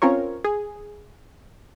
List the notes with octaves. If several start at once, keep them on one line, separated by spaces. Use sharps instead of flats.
C4 C#4 F4 A#4 C#5
G#4